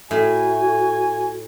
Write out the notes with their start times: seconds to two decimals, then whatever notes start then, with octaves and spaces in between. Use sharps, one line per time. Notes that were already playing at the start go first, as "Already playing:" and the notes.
0.11 A2 F#4 G#5